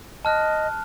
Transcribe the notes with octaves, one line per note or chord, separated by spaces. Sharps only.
D#5 A5 F6 F#6